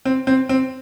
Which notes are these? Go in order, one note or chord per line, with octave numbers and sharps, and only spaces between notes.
C4
C4
C4